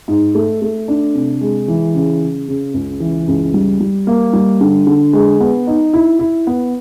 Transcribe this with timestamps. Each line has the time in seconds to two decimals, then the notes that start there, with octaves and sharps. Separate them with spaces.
0.08 G#2
0.35 A3
0.62 A3
0.88 D4
1.14 C3
1.41 G#3
1.68 E3
1.95 C#3
2.22 C#3
2.48 C#3
2.74 C#2
3.00 E3
3.28 C#2
3.54 G3
3.80 G3
4.07 A#3
4.33 G3
4.61 D3
4.87 D3
5.13 G#3
5.40 B3
5.67 D#4
5.93 E4
6.19 E4
6.47 B3